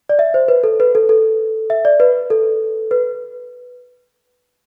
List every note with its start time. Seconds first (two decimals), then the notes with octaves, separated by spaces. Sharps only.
0.09 D5
0.19 E5
0.34 C5
0.48 B4
0.64 A4
0.80 B4
0.95 A4
1.09 A4
1.70 E5
1.85 D5
2.00 B4
2.30 A4
2.91 B4